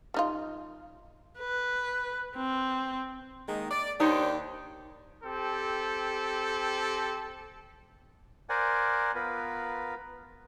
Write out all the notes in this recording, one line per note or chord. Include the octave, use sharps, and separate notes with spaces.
G3 D#4 F4
B4
C4
D#3 G#3 A#3
D5
D#2 D4 D#4 G4 C5 C#5
C4 G4 A4
A#4 C5 D5 F#5 G#5
B3 F4 A#4 B4